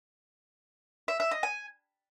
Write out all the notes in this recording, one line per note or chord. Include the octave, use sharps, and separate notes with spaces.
E5
E5
D#5
G#5